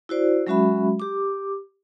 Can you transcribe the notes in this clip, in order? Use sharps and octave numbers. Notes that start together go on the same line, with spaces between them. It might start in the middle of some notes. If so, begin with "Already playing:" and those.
E4 F#4 C5 D5
F#3 G#3 C#4 F#4 E5 B5
G4 D6